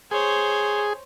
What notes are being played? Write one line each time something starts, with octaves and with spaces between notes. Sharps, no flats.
G#4 C5 C#5